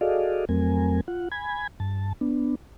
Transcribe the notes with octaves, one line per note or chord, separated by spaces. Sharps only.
F#4 G#4 A4 D5 D#5 F5
F2 F#3 A3 C4 A#4 G#5
F4 F#5
G#5 B5 G#6
G2 A5
B3 D4